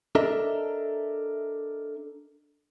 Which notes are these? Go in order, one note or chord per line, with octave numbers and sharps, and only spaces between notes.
D4 A4 A#4 D#5 E5